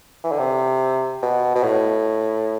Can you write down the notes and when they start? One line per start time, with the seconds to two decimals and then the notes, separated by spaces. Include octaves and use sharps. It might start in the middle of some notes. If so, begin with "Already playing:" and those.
0.24 E3
0.32 D3
0.39 C3
1.23 B2
1.55 B2
1.64 A2